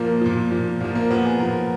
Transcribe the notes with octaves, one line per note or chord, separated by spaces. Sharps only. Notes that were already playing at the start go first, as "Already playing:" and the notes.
Already playing: A#2 F3 A#3
A#2 F3
A#2 F3
A#2 F3 A#3
A#3
A#2 F3 B3
G#4
A#2 F3 A#4